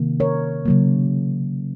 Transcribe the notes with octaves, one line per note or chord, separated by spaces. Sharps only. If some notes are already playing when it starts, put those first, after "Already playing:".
Already playing: C3 D#3 A#3
A#4 C#5
C#3 F#3 A#3